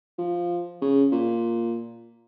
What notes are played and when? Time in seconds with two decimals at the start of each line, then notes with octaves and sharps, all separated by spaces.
0.18 F3
0.81 C#3
1.12 A#2